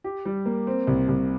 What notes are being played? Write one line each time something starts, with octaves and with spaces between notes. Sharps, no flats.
G4
G3
A#3
C4
C2
C2